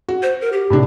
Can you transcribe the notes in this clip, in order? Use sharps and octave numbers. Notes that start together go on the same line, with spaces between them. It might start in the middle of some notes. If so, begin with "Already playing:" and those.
F#4
C5
A#4
G4
A2 C3 D4